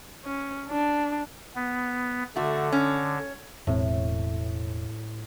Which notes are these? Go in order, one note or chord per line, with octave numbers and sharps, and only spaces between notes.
C#4
D4
B3
D3 A3 F#4
C#4
E1 A2 C4